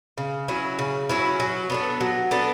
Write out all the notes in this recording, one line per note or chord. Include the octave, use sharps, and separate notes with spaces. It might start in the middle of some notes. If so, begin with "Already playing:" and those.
C#3
F#3 C#4 E4
C#3
F#3 C#4 E4
F#3
B3 D4 A4
F#3
B3 D4 A4